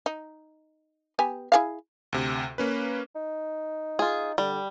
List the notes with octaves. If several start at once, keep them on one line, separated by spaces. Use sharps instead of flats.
D#4
B3 G4 G#5
E4 G#4 F5
D2 C3
A#3 C#4 B4
D#4
F4 G#4
D3 G3